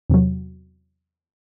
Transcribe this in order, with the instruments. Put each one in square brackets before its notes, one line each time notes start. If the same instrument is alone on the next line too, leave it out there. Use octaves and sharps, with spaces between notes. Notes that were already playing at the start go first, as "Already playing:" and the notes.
[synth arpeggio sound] E2 C3 F#3